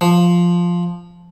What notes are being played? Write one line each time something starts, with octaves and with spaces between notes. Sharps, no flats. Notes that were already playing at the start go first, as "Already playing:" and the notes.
F3